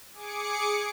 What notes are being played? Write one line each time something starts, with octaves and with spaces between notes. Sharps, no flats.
G#4 D6 C#7